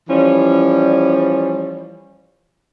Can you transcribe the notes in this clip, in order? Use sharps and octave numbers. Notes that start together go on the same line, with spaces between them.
E3 F3 G3 C#4